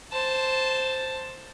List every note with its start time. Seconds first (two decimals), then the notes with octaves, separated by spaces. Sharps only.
0.12 C5 A5